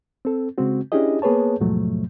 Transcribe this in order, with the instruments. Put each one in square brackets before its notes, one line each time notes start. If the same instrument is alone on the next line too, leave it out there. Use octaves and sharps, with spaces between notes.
[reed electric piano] C4 A4
C#3 G#3 C4 F#4
C#4 D4 E4 G4 G#4 D#5
A#3 B3 G#4 B4 C#5 A5
D#2 G#2 B2 F3 F#3 A3